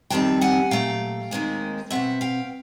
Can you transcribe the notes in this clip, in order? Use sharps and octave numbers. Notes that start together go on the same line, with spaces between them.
F2 C3 D#3 G3 C4 G5 A5
F#5 G#5
A#2 F#3 A3 F5 G5
D#2 D#3 G#3 C4
B2 G#3 C4 E5 F#5
F5 G5